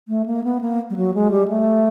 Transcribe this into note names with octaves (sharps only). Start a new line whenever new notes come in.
A3
A#3
B3
A#3
G3
F#3
G#3
G3
A3